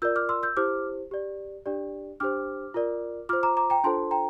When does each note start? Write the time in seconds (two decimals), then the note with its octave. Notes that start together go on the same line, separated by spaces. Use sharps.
0.02 F4 A#4 D5 E6 G6
0.16 D6 F6
0.29 C6 E6
0.43 E6 G6
0.57 E4 G4 C5 D6 F6
1.11 G4 D5
1.66 D4 G4 D5
2.20 D4 G4 C5 D6 F6
2.74 F4 A#4 D5
3.29 F4 C5 D6 F6
3.43 A#5 D6
3.57 A#5 D6
3.70 G5 A#5
3.84 D4 F4 A4 C5 A5 C6
4.11 G5 A#5